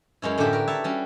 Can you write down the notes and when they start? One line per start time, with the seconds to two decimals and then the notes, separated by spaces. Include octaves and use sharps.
0.22 F#2 G#3 C#4 E4
0.38 A2 D3 E4 F#4 G4 E5
0.53 A#4 B4
0.67 C#5 E5 A5 B5
0.84 G3 C#4 F#4